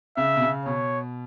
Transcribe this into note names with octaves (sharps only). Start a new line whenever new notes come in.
C#3 E5
B2
C#3
B2 C#5